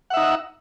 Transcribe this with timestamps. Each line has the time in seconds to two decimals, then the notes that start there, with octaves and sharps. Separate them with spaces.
0.10 F#5
0.14 E5
0.17 D#4